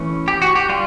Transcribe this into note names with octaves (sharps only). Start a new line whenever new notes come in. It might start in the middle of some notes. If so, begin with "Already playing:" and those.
Already playing: E3 A3 C#4
G4
F#4
G4
G3 F4